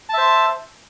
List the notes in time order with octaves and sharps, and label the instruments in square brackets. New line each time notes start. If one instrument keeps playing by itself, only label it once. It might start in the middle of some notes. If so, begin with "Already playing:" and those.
[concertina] A5
E5
C5